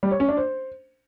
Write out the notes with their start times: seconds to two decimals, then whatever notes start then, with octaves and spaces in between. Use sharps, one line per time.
0.03 G3
0.11 C#5
0.20 C#4
0.29 D4
0.37 C5